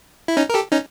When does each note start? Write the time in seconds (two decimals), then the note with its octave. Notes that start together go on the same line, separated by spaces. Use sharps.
0.28 E4
0.37 C#4 D#4
0.50 A#4
0.54 G4 A4
0.72 C#4 D#4